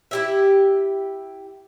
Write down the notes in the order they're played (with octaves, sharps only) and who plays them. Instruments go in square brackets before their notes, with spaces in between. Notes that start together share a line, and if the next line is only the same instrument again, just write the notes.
[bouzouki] E4 G4 E5